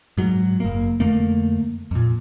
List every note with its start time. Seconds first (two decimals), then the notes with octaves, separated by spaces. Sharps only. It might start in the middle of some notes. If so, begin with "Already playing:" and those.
0.17 G#2 F#3
0.60 F#1 A#3
1.00 F2 D3 A3 A#3
1.91 F2 A#2